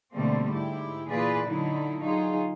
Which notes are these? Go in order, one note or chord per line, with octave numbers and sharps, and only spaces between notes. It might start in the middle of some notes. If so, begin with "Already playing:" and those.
B2 D3 G3 A3 A#3 C4
G#2 E4 G4
A#2 E3 F4 G#4 B4 D5
D3 F#3 D#4 E4
F#3 D#4 F4 G#4